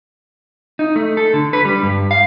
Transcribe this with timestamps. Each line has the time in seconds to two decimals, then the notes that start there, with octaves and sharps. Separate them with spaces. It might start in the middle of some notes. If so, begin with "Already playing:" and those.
0.79 D#4
0.96 A3
1.17 A4
1.34 D3
1.53 B4
1.65 G3
1.83 G2
2.11 F5